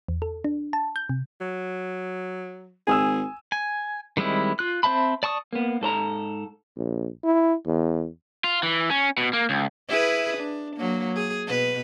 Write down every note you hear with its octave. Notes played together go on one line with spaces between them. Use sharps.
E2
A4
D4
A5
G6
C3
F#3
G#1 G#4 G#5 D#6 E6
G#5
D#3 G3 G#3 C4 E4
F4 F#6
C4 C5 E5 A5 B5
D5 A5 C#6 D#6
A#3 B3
G#2 A4 C5 A#5
A#1
E4
E2
F4
E3
C#4
B2
A#3
C#2
E4 G#4 B4
D4
F#3 A#3
G#4
B2 B4